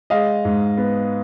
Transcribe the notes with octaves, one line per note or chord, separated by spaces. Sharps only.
G#3 D#5 F5
G#2
B3